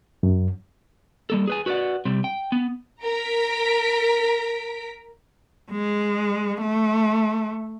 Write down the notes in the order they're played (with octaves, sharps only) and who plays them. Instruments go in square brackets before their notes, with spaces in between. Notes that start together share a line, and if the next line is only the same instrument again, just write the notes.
[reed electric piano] F#2
[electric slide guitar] G3 A#3 A4
G#4 B4 G#5
F#4 B4 C#5 D5 F#5
C3 G3 C4
G5
B3
[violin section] A#4 A#5 B6 D7
[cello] G#3
A3